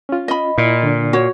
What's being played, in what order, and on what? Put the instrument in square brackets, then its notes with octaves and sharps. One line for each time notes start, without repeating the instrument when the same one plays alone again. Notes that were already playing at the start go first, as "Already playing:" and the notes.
[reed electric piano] C#4 F4
[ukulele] D#5 B5
[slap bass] A#2 [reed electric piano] E4
[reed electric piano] D3 D4
[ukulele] F#4 C#5